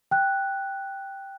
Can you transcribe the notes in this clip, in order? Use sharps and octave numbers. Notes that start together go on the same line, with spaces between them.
G5 F#6